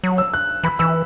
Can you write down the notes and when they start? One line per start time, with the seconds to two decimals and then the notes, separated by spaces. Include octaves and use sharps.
0.04 F#3
0.18 E6
0.34 F#6
0.64 E3 B5
0.79 E3 E6